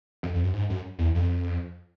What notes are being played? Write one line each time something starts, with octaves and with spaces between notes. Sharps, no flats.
F2
F2
F#2
G#2
F#2
E2
F2